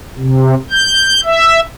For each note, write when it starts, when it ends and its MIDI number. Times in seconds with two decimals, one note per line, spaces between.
0.19 0.54 48
0.71 1.21 91
1.24 1.60 76